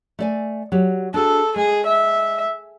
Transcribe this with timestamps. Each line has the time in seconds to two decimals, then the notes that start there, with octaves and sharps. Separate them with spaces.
0.19 A3 D5 G#5
0.72 F#3 G4
1.14 D4 F#4 G#4 A4
1.56 G#3 G#4
1.86 E5